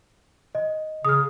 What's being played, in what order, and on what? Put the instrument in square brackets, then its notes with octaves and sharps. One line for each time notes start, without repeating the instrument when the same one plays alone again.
[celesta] D#5
[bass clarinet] C#3 [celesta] D#6 F6